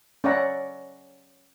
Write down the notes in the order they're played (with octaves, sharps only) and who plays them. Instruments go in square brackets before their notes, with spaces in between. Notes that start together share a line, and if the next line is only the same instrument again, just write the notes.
[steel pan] C#4 C#5 D5 E5 F#5 A#5